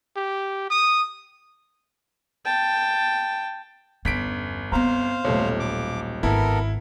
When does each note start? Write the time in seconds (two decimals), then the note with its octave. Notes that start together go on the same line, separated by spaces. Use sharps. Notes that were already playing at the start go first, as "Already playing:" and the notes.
0.16 G4
0.70 D#6
2.45 G5 A5
4.05 G1 E2 C#4 B6 D7
4.72 B3 C4 C5 F5 A#5
5.25 D#1 B1 A3 C#5
5.60 D6
6.23 G#1 B3 E4 A4 A#4 B5